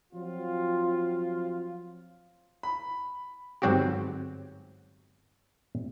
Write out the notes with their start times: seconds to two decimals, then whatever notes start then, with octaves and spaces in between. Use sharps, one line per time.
0.13 F3 F#3 C4 F4
2.63 B5
3.62 G1 G#2 F#3 C4 F#4 G4